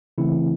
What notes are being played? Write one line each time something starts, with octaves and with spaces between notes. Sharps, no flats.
C#3 E3 A3 C4 E4